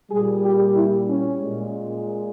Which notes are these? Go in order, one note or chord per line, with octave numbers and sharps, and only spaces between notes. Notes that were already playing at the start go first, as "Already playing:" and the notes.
A#2 G3 G#4
G4
E4
C#4
A#2 G#3